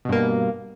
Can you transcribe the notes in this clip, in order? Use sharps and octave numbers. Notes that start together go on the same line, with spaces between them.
G2 B2 A#3